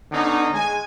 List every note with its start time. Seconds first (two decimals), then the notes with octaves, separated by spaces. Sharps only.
0.12 D3 B3 C#4 D#4
0.54 G#3 G#5